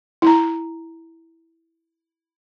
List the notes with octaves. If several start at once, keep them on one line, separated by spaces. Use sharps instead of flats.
E4 A#5